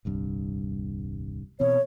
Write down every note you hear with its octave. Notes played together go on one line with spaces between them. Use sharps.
D#1 C2 G2
B2 E3 C4 C#5